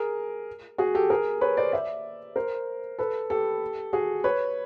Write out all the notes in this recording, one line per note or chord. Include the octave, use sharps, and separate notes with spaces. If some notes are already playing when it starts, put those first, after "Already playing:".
Already playing: G#4 A#4
F#4 G#4
G4 A4
G#4 A#4
B4 C#5
C5 D5
D5 E5
A#4 C5
A4 B4
G4 A4
F#4 G#4
B4 C#5